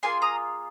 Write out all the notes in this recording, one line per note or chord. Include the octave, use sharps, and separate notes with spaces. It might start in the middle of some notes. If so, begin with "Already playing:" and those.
A#3 F4 G#4 G#5 C6
A#5 D#6